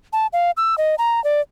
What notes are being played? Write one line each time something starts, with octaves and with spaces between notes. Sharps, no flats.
A5
F5
E6
D#5
A#5
D5